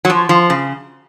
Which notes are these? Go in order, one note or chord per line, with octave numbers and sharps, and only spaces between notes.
F#3
F3
F3
C#3